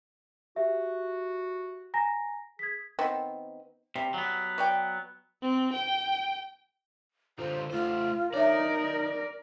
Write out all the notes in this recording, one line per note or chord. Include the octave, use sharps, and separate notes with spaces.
F#4 G4 E5
G#5 A#5 A#6
G#4 G#6 B6
D#3 B3 C4
C3 G3
F#3 B3
C#5 D5 G5
C4
G5
D3 F4 C5
A3 F4 C5
D#4 A#4 C#5 D5 E5